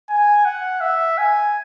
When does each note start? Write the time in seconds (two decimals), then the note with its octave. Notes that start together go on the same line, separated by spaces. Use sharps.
0.09 G#5
0.45 F#5
0.81 E5
1.18 G#5